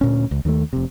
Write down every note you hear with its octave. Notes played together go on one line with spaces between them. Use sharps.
D2 A#2 C#4
C#2
D#2 D#3 G#3 A3
F1 C3